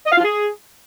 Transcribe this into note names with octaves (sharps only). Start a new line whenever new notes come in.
D#5
F5
F4
G#4